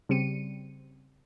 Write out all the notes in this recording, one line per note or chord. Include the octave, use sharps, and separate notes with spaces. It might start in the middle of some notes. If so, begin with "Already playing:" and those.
C#3 G3 C4 C#7 D#7